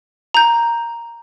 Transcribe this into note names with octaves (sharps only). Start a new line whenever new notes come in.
A#5 G6